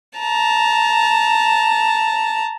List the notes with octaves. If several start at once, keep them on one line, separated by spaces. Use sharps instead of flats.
A5 A#5